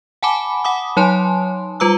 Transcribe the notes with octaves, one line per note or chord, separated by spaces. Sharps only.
F#5 G#5 A5 B5 D6
F#5 B5 D6 D#6
F#3 D#4 C#5 G#5 A5 C6
G3 F4 B4 A#5 D6 E6